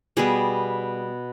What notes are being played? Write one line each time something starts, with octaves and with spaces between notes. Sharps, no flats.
B2 G3 B3 G#4